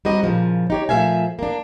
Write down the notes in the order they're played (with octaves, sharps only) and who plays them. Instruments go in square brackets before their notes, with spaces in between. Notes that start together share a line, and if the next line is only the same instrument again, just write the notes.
[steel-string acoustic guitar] G3 C4 D#4 F#4 D#5
A#2 C#3 F3
D#4 G4 C#5
A#2 F3 A3 E5 F5 G#5
A#3 D4